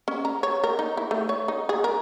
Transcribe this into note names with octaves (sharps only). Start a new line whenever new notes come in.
C#4
A#5
C#5
A#4
D#4
E4
A3
C#5
D#4
G#4
A#4